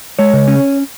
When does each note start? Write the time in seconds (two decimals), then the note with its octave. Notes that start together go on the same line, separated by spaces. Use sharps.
0.19 G#3 C#5
0.33 C#3
0.48 C#4